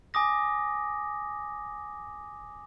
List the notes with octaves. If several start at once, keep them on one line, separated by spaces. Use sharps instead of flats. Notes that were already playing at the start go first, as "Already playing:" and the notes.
G#5 D6 D#6 A#6